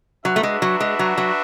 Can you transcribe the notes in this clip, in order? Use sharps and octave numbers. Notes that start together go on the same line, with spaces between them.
F#3 D4 F#4 B4 E5
A3
G#3
F#3
G#3
F#3
F#3